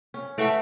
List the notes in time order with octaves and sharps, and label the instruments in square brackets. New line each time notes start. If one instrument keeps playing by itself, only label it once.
[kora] C#4
[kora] A3 [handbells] E4 B4 F#5 A5